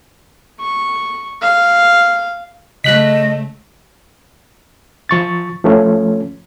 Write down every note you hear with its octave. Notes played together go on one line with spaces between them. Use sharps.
C#6
F5
C#3 A3 D#5 F#6 B6
F3 C#6 A6
F3 A3 C#4